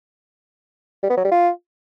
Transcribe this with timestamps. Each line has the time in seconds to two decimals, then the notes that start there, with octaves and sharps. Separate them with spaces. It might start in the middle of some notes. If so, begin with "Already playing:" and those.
1.03 G3
1.10 B3
1.17 F#3
1.24 G3
1.31 F4